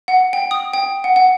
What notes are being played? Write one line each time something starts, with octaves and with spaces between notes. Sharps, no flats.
F#5
G5
D#6
G5
F#5
F#5